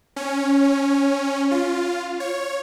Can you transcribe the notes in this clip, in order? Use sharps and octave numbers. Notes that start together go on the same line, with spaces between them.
C#4
F4
C#5